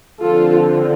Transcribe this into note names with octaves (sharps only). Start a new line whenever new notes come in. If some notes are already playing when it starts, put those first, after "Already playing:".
D3 F3 C4 F4 A4